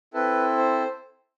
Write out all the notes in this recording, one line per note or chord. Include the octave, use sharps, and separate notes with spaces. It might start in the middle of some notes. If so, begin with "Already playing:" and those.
C4 E4 A4 B4
C5